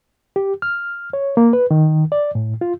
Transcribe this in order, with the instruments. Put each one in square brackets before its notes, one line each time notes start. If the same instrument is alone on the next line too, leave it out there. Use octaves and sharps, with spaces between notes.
[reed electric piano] G4
F6
C#5
A#3
B4
D#3
D5
A2
F4